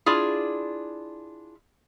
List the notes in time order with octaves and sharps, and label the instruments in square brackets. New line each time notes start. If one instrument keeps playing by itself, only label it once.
[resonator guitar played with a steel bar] D4 E4 F4 G#4